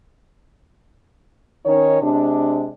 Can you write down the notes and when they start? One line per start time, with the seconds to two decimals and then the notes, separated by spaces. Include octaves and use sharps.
1.65 D#3 C#4 D#4 C#5
2.01 C3 G#3 D4